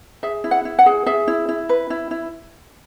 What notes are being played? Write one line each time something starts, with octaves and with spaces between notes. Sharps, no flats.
G#4 E5
E4
F#5
E4
F#5
G#4
G#4 E5
E4
E4
B4
E4
E4